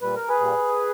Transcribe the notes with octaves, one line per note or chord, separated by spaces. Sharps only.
A#2 G3 B4
A#4
G#4 B4
A#2 G3